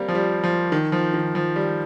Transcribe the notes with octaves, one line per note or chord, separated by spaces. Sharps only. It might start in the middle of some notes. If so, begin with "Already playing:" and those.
Already playing: G3 A#3 C4
F3
G3
F3
D#3
F3
D#3
F3
G3